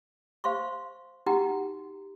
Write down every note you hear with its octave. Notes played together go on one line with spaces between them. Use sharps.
C5 F5 C6 C#6
D#4 F#4 G4 F#5 G5 A#5